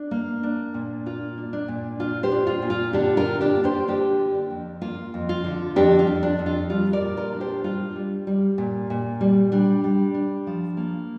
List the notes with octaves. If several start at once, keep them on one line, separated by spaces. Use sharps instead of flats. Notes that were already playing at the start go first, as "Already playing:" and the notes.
Already playing: D4
A#3
D4
A#2
A#3 F4
D4
D4
A#2
D4 F4
G4 C5
D4
F4
A#2
F4
D3 D4 G4
F4 A#4
A#3
D4 G4
A#3
G4 C5
D3 D4 G4
A#3
D4
F2
A#3 F4
F2
F4
D3
F2 D4 G4
F4
F2
D4
F2
F4
G3 F4
A#4 D5
A#2
F4 A#4
D4
G4 C5
G3 F4
G3
G3
A#2
A#2
G3
G3 D4
G3
D4
F3
A#3